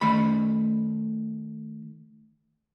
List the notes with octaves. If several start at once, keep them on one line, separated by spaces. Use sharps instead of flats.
D#3 A3 B5